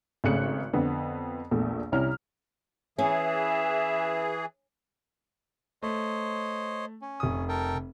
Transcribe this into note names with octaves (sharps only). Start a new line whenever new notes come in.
G#1 C#3 A3 F#6 C#7
F2 D3 B3
A#1 E2 A#2 A3
C2 C#4 E4 A#5 F6
E3 C#4 G#4 E5
A3 C5 C#5 D#5
C#4
F1 D#6
A4 A#4 G5